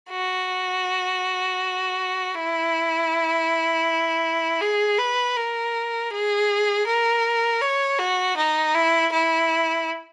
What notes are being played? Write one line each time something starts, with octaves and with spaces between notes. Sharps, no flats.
F#4
E4
G#4
B4
A#4
G#4
A#4
C#5
F#4
D#4
E4
E4